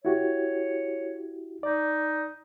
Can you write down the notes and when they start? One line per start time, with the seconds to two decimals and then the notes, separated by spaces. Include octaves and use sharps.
0.05 E4 F#4 G4 C#5
1.63 D#4 D5